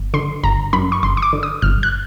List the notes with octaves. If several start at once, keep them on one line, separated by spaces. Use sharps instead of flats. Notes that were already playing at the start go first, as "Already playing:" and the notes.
Already playing: G1
D3 C6
G1 A#5
F#2 B5
C#6
G1 C6
C#6
D6
D3
D#6
G1 F6
F#6